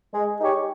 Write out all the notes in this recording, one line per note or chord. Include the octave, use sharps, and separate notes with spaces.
G#3
D#4 G4 C#5